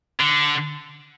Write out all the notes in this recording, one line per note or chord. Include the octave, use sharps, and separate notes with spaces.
D3